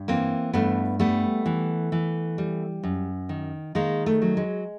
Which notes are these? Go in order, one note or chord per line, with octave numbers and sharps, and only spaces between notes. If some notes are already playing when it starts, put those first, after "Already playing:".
Already playing: G2
E3 A#3 C4
G2 A3 B3
G3 A3 B3
E3
E3
G3
F#2
D#3
D#3 G#3 A#3
A3
F#3
G#3